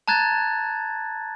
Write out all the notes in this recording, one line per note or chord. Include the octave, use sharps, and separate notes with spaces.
A5 A#5 F#6 G#6 A6